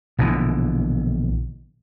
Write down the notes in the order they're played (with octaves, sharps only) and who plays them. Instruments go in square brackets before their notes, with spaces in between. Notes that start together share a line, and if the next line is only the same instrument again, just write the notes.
[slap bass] A#1 B2 D3 E3